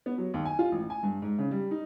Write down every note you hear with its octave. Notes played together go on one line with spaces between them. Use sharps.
B3
F#3
D#2
G#5
F4
A1
G#5
G2
G#2
C#3
G3
D#4